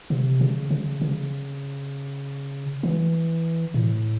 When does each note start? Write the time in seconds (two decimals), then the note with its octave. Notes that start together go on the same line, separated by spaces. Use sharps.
0.10 C3
0.41 C#3
0.71 C#3
1.02 C#3
2.83 E3
3.74 A2